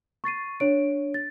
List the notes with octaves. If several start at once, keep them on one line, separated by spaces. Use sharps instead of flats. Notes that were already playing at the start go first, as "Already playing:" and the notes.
C#6 A6 C7 D#7
D4 C#5 D7
A6